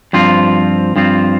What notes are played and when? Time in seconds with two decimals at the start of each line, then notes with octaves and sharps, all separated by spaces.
0.13 G2 F3 C4 F4
0.96 G2 F3 C4 F4